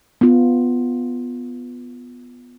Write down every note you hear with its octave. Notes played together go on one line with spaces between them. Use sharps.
B3 F4